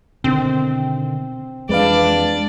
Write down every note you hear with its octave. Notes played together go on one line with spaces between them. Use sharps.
B2 D3 D#3 C4
F2 E3 G#3 D4 B4 D5 F5